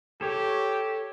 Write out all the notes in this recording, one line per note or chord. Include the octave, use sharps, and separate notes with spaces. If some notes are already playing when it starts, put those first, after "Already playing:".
G4 A4 C#5